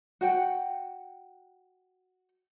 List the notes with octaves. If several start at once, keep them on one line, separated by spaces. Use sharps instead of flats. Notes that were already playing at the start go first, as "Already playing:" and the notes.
F#4 F#5 G5